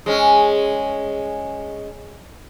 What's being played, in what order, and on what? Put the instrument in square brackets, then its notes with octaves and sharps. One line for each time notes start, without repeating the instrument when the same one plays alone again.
[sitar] G#3 C#4